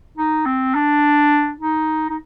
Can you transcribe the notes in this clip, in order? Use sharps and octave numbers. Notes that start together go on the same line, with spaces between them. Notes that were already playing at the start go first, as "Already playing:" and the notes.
D#4
C4
D4
D#4
D#4